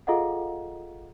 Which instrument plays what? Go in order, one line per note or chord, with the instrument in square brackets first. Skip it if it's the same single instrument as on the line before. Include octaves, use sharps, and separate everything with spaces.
[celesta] F4 G#4 A4 D#5 F5 F#5